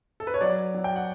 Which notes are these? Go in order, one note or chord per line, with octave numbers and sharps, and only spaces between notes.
A4
B4
C#5
F#3 D5
F#3
G5
F#5